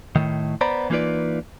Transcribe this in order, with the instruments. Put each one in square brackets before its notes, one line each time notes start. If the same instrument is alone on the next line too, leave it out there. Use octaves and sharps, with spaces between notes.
[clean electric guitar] A2 D#3
B3 C5 D5 A#5 B5
E3 A#3 D#4 F4 B4 D5